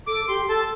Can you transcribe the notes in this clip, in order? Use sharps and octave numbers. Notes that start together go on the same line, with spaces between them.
A4 D6
G4 C6
A4 A5